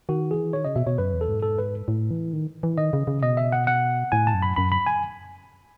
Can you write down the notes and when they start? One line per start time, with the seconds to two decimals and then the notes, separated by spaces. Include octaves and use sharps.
0.09 D#3 F#4
0.31 E3 G#4
0.53 D#3 C#5
0.65 C#3 D#5
0.76 B2 E5
0.87 B2 C#5
0.98 F#2 B4
1.13 E2
1.21 A4
1.29 G#2
1.43 A4
1.59 B4
1.88 A2
2.11 E3
2.33 D#3
2.63 E3
2.77 D#3 D#5
2.93 C#3
3.07 C#3
3.23 B2 D#5
3.37 E5
3.52 F#5
3.67 F#5
4.12 A2 G#5
4.27 A5
4.34 F#2
4.42 B5
4.56 F#2 B5
4.72 B5
4.86 G#5